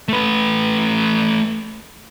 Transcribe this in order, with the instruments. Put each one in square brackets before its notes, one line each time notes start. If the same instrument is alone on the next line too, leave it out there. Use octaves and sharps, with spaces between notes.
[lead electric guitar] A3 B4